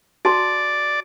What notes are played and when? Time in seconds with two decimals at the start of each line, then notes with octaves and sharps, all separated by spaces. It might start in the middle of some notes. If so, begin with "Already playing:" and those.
0.25 F#4 D5 A5 C6